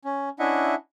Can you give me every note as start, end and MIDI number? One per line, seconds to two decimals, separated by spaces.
0.05 0.29 61
0.39 0.75 61
0.39 0.75 62
0.39 0.75 64
0.39 0.75 75
0.39 0.75 76
0.39 0.75 78